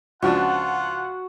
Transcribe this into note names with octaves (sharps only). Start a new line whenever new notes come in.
C#2 F3 D4 F4 F#4 F#5